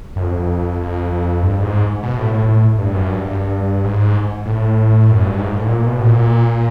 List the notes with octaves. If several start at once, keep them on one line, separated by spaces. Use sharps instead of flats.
F#2
F2
F2
F2
G2
G#2
B2
A2
A2
A2
G2
F#2
G2
G2
G#2
A2
F#2
G2
G#2
A2
A#2
B2
A2
A#2